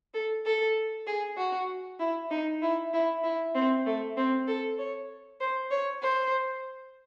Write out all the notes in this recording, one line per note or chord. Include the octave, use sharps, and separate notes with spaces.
A4
A4
G#4
F#4
E4
D#4
E4
E4
E4
C4
A3
C4
A4
C#5
C5
C#5
C5